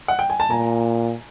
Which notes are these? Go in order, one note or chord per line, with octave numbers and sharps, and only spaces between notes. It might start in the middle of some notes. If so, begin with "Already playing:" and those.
F#5
G5
G#5
A5
A#2 G#5 A#5